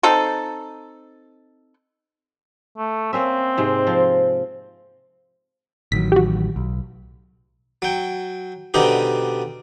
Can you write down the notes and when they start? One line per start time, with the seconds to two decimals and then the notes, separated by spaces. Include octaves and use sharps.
0.03 C4 D#4 A4
2.78 A3
3.13 A#3 C4 C#4 E5
3.58 G#2 C3 G#3
3.87 F3
5.92 A1 D#3 F#3 B6
6.12 F#4 G4
6.56 B1
7.82 F#3 G5
8.74 B2 D3 G3 C4 D#4 G4